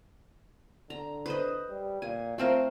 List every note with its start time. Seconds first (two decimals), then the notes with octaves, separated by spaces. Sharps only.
0.90 D3 A#5
1.26 B4 C5 D#5
1.69 G3
2.02 A#2 G#5
2.38 A3 C4 F4 A#4